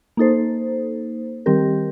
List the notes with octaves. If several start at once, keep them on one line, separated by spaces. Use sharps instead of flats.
A#3 D#4 A4 C5
D#3 G3 C4 G4 A#4